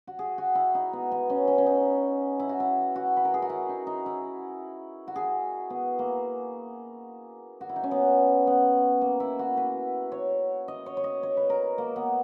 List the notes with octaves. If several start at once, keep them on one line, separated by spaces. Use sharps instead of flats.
F#4
G#4
F#4
E4
D#4
B3
B3
C#4
C#4
C#4
D#4
E4
F#4
E4
F#4
B4
A#4
G#4
F#4
E4
D#4
D#4
E4
F#4
G#4
B3
A#3
F#4
E4
D#4
C#4
B3
B3
A#3
E4
F#4
B4
C#5
D#5
C#5
C#5
D#5
C#5
B4
A#4
A#3
B3